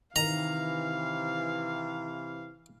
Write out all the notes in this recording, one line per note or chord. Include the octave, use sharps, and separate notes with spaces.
C3 D#3 E3 F5 A#5